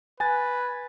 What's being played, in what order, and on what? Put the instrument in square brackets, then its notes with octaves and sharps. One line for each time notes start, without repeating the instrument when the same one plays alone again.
[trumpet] B4 [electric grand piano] G#5 F#6 A6